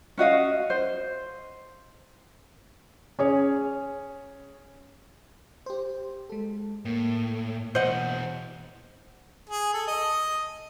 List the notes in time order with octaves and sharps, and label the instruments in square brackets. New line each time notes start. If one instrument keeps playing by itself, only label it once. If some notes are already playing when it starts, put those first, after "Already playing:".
[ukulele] C#4 F#4 D#5 F5
C5
[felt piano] C#4 G#4 C#5
[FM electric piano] G4 C5
G#3 A4
[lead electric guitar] A2 [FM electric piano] A#3
[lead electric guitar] B2 E3 [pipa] C5 D#5 F#5
[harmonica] G#4
A4
D#5